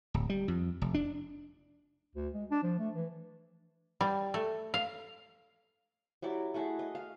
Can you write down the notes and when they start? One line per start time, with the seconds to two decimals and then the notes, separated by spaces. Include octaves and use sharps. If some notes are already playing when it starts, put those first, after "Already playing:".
0.14 D1
0.30 G3
0.48 F2
0.82 F1
0.94 D4
2.15 D2
2.34 G#3
2.50 D4
2.63 F3
2.79 A3
2.95 E3
4.01 G3
4.34 A3
4.74 F5
6.22 F#3 E4 G4 D5
6.54 A3 E4 F#4 G#4
6.79 D#5
6.95 F5